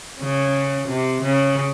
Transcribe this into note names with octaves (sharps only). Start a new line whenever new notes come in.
C#3
C3
C#3